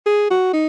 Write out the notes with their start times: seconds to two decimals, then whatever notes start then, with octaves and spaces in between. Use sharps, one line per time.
0.06 G#4
0.30 F#4
0.53 D#4